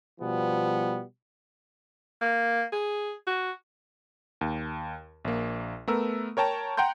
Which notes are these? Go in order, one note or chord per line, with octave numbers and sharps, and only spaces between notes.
B2 F3 G3 B3
A#3
G#4
F#4
D#2
A#1 A#3
A3 B3 A#4 E6
A#4 C#5 G5 A5 A#5
F#5 G5 A#5 C6 G6